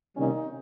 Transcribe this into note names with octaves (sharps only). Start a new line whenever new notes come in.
C3 D#3 G3 A#3 C#4 D#4